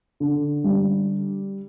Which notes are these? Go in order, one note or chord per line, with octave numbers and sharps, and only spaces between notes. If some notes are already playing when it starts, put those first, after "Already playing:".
D3
G3